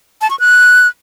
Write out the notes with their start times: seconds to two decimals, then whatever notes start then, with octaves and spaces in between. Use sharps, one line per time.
0.21 A5
0.30 C#6
0.40 F#6